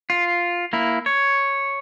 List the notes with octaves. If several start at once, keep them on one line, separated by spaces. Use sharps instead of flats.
F4
A#3 E4
C#5